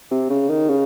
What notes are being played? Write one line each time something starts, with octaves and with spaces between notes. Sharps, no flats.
C3
C#3
D#3
C#3